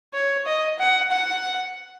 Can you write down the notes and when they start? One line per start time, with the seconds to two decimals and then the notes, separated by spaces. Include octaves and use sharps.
0.14 C#5
0.46 D#5
0.79 F#5
1.11 F#5